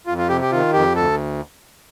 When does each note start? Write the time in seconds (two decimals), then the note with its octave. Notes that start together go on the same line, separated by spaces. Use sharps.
0.07 F2 F4
0.18 F4
0.29 C3 G4
0.41 G4
0.51 D#3 F4
0.73 F2 G4
0.95 D2 A4